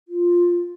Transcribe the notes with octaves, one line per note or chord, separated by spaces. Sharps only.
F4